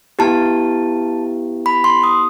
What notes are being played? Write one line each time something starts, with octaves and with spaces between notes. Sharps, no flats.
B3 E4 G4 A5
B5
C6
D#6